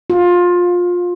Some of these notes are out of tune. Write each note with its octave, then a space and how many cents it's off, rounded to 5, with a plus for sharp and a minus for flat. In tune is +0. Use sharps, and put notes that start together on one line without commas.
F4 +20